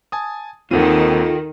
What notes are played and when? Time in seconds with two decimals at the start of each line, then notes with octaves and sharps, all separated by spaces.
0.12 G#5 A5 D#6
0.71 D#2 D#3 C4 F4 A4 F#5 D#7